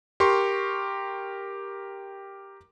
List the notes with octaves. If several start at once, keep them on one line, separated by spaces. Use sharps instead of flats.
G4 A#4 C6 C#6